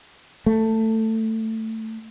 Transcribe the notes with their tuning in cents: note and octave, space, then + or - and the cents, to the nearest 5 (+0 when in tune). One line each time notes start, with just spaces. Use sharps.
A3 +15